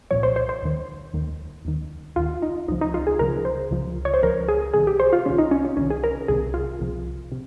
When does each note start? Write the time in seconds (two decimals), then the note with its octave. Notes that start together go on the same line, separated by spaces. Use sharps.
0.11 C2 A#2 F3 C#5
0.23 C5
0.36 C5
0.49 C5
0.62 D#2 D#3
1.14 D#2 D#3
1.65 D#2 D#3
2.16 D#2 D#3 F4
2.42 D#4
2.68 C#2 C#3 F3 D#4
2.81 D#4
2.94 F4
3.07 G#4
3.19 C#2 C#3 F3 A#4
3.45 C5
3.71 C#2 C#3 F3
4.05 C#5
4.14 C5
4.23 C#2 C#3 F3 A#4
4.48 G#4
4.74 C2 C3 D#3 G#4
4.87 G4
5.00 C5
5.13 F4
5.26 C2 C3 D#3 C#4
5.38 D#4
5.51 C#4
5.65 C#4
5.77 C2 C3 D#3 C#4
5.90 G#4
6.04 A#4
6.28 C2 C3 D#3 G#4
6.54 F4
6.80 C2 C3 F3
7.32 C3